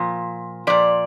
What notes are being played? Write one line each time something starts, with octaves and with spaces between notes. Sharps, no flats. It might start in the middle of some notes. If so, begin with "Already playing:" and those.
Already playing: A#2 F3
A#2 F3 D5